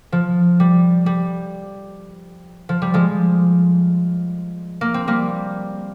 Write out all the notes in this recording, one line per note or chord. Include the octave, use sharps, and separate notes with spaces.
F3
G3
G3
F3
G3
F3 G#3
A#3
C4
G3 A#3